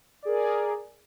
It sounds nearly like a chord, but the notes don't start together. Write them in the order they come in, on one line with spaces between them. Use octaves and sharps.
D5 G#4 A#4